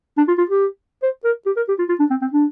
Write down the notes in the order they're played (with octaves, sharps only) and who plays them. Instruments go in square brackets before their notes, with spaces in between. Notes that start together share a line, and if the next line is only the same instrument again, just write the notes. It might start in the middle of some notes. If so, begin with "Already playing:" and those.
[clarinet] D4
F4
F4
G4
C5
A#4
G4
A#4
G4
F4
F4
D4
C4
C4
D4